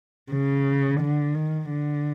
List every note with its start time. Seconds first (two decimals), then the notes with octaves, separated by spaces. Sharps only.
0.32 C#3
1.01 D3
1.34 D#3
1.69 D3